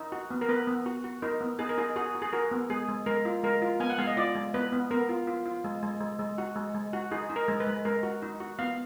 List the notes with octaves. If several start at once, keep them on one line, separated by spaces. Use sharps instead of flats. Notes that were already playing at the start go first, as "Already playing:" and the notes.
Already playing: D#4
F#4
B3
A#4
B3 B4
B3
F#4
F#4
D#4 A#4
B3
D#4 G#4
A#4
D#4 G#4
F#4 G#4
F#4
G#4
F#4 A#4
B3
G#3 G#4
G#3
G#3 A#4
F4
G#3 A#4
F4
B3 G#5
F#5
G#3 F5
D#5
F4 D5
G#3
B3 B4
B3
B3 A#4
F4
F4
F4
G#3
G#3
G#3
G#3
F#4
G#3
G#3
F#4
D#4 G#4
D#4
A#4
G#3
B4
G#3
G#3 A#4
F#4
D#4
F#4
B3 F5